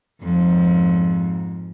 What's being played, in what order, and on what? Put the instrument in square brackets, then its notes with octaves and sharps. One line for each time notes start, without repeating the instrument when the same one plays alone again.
[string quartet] F2 G#2